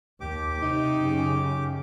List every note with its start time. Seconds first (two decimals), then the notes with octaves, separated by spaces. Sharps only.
0.21 D#2 G4 D6
0.62 C3 D#4
0.98 F#2 C#3